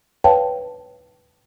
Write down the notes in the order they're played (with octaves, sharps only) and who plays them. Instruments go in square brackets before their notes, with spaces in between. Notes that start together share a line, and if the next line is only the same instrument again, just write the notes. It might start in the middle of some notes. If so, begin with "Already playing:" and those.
[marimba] B4 C#5 F5 G5 A5